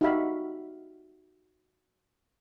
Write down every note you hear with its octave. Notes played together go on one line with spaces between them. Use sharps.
D#4 F#4 G4 E5 F5 B5